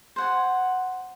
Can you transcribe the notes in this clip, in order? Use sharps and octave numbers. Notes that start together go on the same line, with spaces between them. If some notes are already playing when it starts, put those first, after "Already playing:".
C5 F#5 G#5